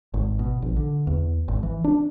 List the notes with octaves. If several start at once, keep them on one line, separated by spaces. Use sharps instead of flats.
G#1
B2
A#1
D3
E2
G#1
E3
D4